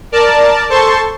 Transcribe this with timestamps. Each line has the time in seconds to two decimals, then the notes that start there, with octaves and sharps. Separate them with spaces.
0.12 A#4 D5 A5
0.69 A4 C5 A5 C6 C#6